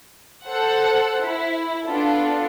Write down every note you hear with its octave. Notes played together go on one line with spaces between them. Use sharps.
A4 C5 F#5
E4
B3 D4 F4 A4